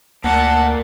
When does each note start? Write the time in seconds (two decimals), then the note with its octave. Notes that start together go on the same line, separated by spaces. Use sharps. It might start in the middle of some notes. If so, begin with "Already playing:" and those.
0.24 D2 A#3 A#4 D5 F#5 A5